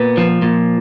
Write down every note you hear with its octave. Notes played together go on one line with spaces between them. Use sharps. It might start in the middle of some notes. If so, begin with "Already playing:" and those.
Already playing: A#2 B3
F3
A#2